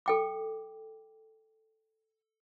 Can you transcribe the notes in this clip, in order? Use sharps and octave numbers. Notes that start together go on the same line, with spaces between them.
A4 G5 D6